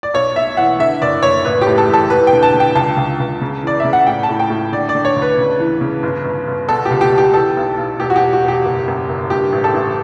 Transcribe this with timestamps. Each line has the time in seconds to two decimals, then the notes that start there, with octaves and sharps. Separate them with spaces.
0.03 D5
0.14 B1 C#5
0.35 B1 E5
0.57 E3 F#5
0.79 D3 E5
1.02 F#1 D5
1.23 F#1 C#5
1.45 A1 B4
1.62 G4
1.67 A2
1.78 A4
1.89 E3 A4
2.10 E1 B4
2.27 G5
2.33 D3
2.43 A5
2.54 D3
2.60 G5
2.75 C#2 A5
2.97 C#2
3.20 C#2
3.41 C#3
3.63 E3 D5
3.80 C#3 E5
3.93 F#5
4.07 A2 G5
4.23 A5
4.29 A2
4.40 G5
4.50 A2
4.72 D3 D5
4.89 D5
4.95 D3
5.05 C#5
5.16 D2
5.22 B4
5.38 C#3
5.60 E3
5.81 C#3
6.03 G1
6.25 G1
6.48 G1
6.69 B2 A4
6.85 G4
6.91 C#2
7.01 G4
7.12 B2
7.18 G4
7.34 E3 A4
7.57 B1
7.78 B1
8.00 E1 G4
8.10 F#4
8.16 G4
8.22 E1
8.33 F#4
8.44 E1 G4
8.65 F#1
8.88 F#2
9.09 F#1
9.30 G2 G4
9.52 A1
9.64 A4
9.74 A1